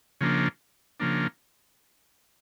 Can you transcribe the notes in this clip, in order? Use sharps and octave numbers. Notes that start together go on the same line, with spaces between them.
C#3 F3 A#3 D4
C#3 F3 A#3 D4